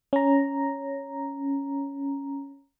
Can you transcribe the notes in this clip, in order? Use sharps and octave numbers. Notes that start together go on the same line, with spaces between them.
C#4 A#5